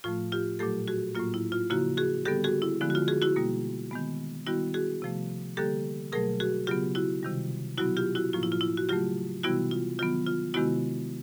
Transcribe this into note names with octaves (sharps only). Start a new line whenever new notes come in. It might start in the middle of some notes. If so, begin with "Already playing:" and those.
A2 F3 A3 F4
F4 G4
A#2 F#3 A3 G4 A4
F#4 G#4
A2 F#3 A#3 F4
E4
F4
C#3 F3 A#3 E4 F#4
F#4 G#4
D3 G3 B3 G4 A4
F#4 G#4
E4
D3 F3 G#3 B3 E4
F#4
F4
F#4 G#4
E4 F#4
B2 G3 A#3
D#3 G#3 B3
D#3 G3 B3 E4 F#4
F#4 G#4
C3 F3 A3
D3 G3 A#3 G4 A4
B2 F#3 A3 G#4 A#4
F#4 G#4
C#3 F#3 B3 F4 G4
E4 F#4
C3 D#3 G3
B2 F#3 B3 E4 F#4
F4 G4
E4 F#4
A2 F3 A#3 F4
E4
F4
E4
F#4
C#3 F#3 A3 F4 G4
C3 E3 G3 B3 E4 F#4
F4
D#3 F#3 B3 F4
F4
C3 D#3 G#3 B3 E4 F#4